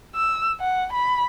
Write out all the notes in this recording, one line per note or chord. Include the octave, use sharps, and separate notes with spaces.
E6
F#5
B5